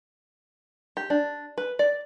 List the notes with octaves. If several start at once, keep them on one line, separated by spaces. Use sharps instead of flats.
G4
D4
B4
D5